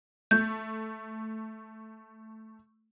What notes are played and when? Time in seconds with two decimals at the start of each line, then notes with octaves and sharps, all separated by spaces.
0.31 A3 G6